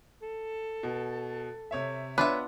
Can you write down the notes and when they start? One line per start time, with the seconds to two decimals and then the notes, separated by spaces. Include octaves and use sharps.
0.22 A4
0.83 B2
1.71 C3 C#5 E5
2.18 B3 D4 F4 B4 C#5 E5